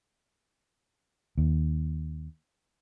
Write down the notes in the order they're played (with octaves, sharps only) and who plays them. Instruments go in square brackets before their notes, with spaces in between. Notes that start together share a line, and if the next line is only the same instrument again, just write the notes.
[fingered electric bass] D#2